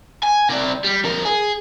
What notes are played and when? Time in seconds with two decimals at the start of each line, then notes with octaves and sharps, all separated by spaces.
0.23 G#5
0.49 C3 D5
0.84 G3
1.04 F2 A#4
1.25 G#4